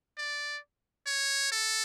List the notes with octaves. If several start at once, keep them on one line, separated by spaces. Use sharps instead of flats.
D5
C#5
A4